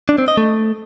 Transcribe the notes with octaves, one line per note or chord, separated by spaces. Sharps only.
D4
C4
D#5
A3